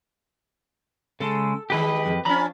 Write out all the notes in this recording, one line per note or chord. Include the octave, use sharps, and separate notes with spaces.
C#3 G#3 A4
D#3 G#3 G4 B4 D#5
F2
F3 C#4 D4 A#5 B5